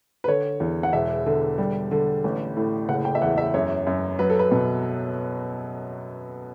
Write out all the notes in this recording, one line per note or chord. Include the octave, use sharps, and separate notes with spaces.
B4
D3 C#5
E2
F#5
E1 E5
D3
G3
D3
A1
A2
F#1 F#5
G5
E5
E2 F#5
E5
F#2 C#5
F#2
F#3 B4
A4
B4
B2